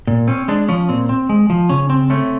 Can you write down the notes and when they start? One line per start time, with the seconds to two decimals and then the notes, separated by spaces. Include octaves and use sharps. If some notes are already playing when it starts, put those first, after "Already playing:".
0.07 A#2
0.27 C4 C#4
0.48 G#3 D4
0.68 F3 C#4
0.89 A#2 C4
1.09 C4
1.29 G#3
1.50 F3
1.69 C#3 C#4
1.90 C4
2.10 A3 C#4